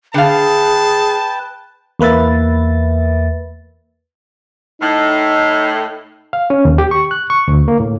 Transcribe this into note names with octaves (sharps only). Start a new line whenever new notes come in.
D3 G#4 B4 F5 G5 A5
E2 A#3 B4 E5 A6
A2 D#4
F5
C#4
D#2
G4
C#6
F#6
C#6
D2
A#3
A2